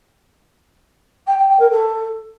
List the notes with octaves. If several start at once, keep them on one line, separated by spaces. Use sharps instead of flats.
G5
G5
G5
A#4
A4